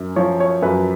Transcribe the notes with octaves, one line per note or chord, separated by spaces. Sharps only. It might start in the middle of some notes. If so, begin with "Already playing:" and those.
Already playing: F#2
F3 C#5
C#5
F#2 B4